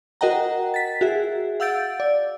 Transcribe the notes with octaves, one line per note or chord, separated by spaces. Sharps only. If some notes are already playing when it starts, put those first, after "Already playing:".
F#4 A#4 D#5 F#5 G5 A#5
A6 B6
F#4 G#4 E5
F5 F#5 E6 G6 A6 D7
D5